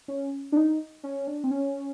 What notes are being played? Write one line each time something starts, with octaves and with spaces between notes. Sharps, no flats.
C#4
D4
D#4
C#4
D4
C4
C#4